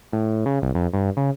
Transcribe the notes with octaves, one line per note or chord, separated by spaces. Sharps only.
A2
C#3
C2
F2
G2
C#3